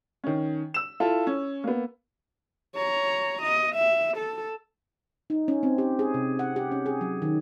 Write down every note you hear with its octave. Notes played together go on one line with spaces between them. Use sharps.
D#3 C#4
E6 E7
E4 F4 A4
C#4
A#3 B3
C#5 A#5
D#5
E5
A4
D#4
C#4
C4
G4
G#4
C3
F#5
G4
C#4
G#4
F#3
D#3